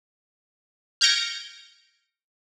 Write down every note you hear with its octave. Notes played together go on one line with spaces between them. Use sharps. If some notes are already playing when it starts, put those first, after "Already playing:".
F6 G6 G#6 A#6 C#7 D7